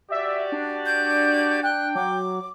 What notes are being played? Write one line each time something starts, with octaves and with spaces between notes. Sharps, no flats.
F#4 G4 D5 E5
D4
G6
G5 F#6
F#3 D6